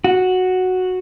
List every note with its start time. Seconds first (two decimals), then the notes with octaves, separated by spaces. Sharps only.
0.04 F#4